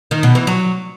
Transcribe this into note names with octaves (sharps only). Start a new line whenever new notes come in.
D#3
B2
E3
F#3